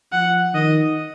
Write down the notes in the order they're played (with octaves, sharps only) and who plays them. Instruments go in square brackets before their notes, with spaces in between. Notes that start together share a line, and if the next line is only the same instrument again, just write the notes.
[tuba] F3 [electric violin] F#5
[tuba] D#3 [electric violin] D#5